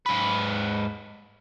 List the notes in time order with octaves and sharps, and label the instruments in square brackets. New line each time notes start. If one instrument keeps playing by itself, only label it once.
[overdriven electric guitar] G#2 B4